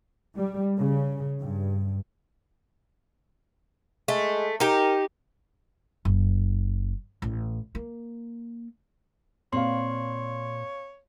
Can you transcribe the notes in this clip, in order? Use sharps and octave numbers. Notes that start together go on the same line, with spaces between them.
G3
C#3
G2
G#3 A3
D#4 G4 A#4
F#1
A1
A#3
A#2 C4 C#5 F5 C6